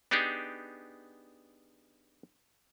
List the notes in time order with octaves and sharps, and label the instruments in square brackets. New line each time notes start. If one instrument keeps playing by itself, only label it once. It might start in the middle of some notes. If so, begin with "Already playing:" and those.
[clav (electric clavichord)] B3 D4 D#4 G4 G#4